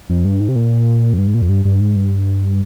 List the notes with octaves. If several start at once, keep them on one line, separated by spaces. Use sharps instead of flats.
F2
G2
G#2
C3
A#2
F2
G2
G#2
A#2
F2
G2
G2
G#2
G2